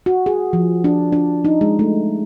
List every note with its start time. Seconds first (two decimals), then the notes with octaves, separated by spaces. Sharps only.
0.06 F#4
0.26 G#4
0.53 F3
0.84 D4
1.13 D4
1.45 D#4
1.61 G#3
1.79 A3